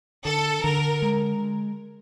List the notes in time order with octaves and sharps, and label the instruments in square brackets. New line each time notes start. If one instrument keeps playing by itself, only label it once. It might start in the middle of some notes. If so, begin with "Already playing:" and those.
[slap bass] D3 [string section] A4
[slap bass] D3 [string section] A#4
[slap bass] G#3